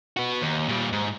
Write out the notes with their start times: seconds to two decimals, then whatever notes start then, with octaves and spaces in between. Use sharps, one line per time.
0.17 B3 F#4
0.41 D#2
0.68 A#2 G3
0.92 G#2